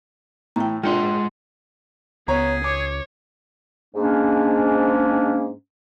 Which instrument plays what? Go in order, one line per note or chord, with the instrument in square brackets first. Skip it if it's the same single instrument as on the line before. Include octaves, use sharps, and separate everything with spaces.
[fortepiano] A2 E3 [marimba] G5 A#5
[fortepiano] A#1 D4 G5 [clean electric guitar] G#3 F#5 C6 [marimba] F4
[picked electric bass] C#2 [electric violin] B3 [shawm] G#4 [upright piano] C#5 A#5
[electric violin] C#5 [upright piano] D6
[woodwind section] G#2 A#3 C#4 D4